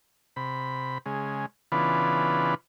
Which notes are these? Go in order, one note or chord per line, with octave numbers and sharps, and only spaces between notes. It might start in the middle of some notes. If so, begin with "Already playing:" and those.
C3 B5
C#3 G#3
C#3 E3 B3 D4 F4 B4